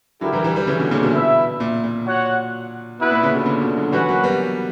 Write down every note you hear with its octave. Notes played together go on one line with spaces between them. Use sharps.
D3 F#3 E4 G4 A#4
E3 G3
E3 G3
E3 G3
C#3 E3
B2 D3
A#2 C#3
B2
E4 B4 E5
A#2
A#2
F#4 C#5 F#5
B2 B3 E4 B4
A#2
A#2 C#3
B2 D3
A#2 C#3
B2 D3
D3 F#3
E3 G3 C#4 F#4 B4 F#5
F#3 A#3
G3 B3